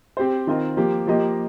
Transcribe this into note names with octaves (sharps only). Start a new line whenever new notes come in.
C4 G4 C5
D#3 C4 F4 A#4 D#5
F3 A#3 G4
F3 A#3 G4 D#5